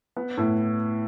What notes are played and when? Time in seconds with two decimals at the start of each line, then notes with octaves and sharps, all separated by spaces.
0.17 B3
0.37 A2